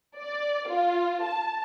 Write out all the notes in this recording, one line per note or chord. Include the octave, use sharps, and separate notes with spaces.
D5
F4
A5